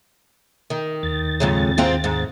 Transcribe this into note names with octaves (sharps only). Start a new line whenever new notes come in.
D#3
D#2 A6
F2 G#2 C#3
G#2 C4 F4
G#2